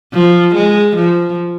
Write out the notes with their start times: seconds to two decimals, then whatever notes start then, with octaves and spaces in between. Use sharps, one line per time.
0.13 F3
0.55 G#3
0.96 F3